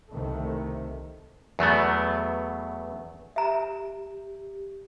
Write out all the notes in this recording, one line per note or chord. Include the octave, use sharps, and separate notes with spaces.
C2 C3 D#3 A3
E2 F#3 A3 B3
G4 E5 A#5